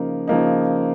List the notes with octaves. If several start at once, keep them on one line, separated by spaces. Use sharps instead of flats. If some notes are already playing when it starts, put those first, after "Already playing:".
Already playing: C#3 F3 A#3 D#4
C#3 F3 A#3 D#4